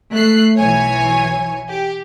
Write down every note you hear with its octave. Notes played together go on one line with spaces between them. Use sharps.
A3 F#6 C7
B1 E3 F#3 C#5 G#5
G4